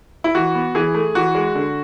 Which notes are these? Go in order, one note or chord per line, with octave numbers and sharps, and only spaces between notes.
E4
E3 F#4
B3
E3 G#4
A3
E3 F#4
G#3
D3